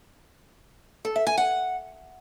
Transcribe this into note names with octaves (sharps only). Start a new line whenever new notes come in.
A4
E5
G#5
F#5